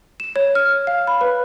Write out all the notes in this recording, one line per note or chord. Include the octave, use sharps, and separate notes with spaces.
E7
C#5
F6
F5
B5
B4